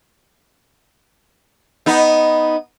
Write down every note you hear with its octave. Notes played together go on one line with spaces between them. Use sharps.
B3 D#4